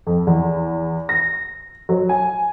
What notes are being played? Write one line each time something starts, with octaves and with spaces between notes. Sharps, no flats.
F2
E2
A#6
F#3
G#5